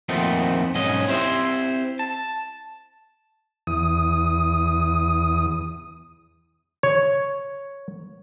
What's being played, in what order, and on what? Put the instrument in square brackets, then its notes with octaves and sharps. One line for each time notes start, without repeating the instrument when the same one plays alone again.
[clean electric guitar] F2 A#2 D#3 A3 B3 C4
B1 G#2 B3 C#4 D#5
C4 E4 G4 C5
A5
[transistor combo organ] E2 D#6
[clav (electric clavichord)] C#5